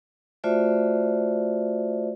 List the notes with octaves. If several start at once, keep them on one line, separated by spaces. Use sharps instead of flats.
A3 F4 F#4 C5 D5 E5